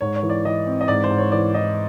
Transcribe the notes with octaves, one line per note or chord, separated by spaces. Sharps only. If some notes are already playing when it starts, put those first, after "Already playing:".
G#2 C#5
C#5
E3
D5
E3 D#5
C4
D#5
G#2 D5
C5
G#2
C#5
E3 D5
E3 D#5